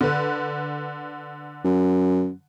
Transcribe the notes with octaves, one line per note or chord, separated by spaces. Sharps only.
D3 B4
F#2